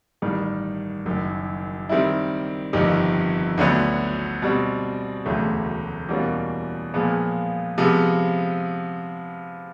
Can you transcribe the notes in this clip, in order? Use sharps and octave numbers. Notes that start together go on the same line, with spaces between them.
A1 G2 D#3 G3
F#1 F#2 D#3
D#3 G3 C4 E4
G1 F2 C3 D#3
D2 D3 F#3 B3
B2 G3 C4
E1 D2 C#3 F#3 A3
E2 B2 G3 A#3 C#4
A#2 F3 G#3 B3
C3 F3 G#3 B3